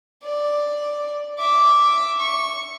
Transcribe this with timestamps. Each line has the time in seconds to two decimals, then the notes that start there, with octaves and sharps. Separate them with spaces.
0.23 D5
1.38 E5 D6
2.19 C#6